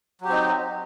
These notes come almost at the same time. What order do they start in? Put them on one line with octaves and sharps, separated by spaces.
F#3 G4 C4 D#4